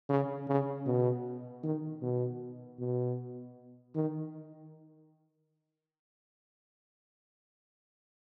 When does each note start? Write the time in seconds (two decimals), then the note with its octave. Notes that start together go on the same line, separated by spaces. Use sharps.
0.09 C#3
0.48 C#3
0.86 B2
1.63 D#3
2.02 B2
2.79 B2
3.95 D#3